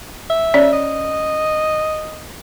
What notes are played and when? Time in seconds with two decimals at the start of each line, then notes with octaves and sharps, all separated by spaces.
0.30 E5
0.54 C#4 C#5 D5
0.72 D#5